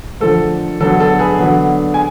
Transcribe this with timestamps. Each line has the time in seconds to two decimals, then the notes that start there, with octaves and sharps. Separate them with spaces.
0.21 D3 F3 A3 A4
0.80 D3 F#3 B3 A4
1.00 A4
1.19 G#4 B4
1.39 D3 F#3 B3
1.94 G#5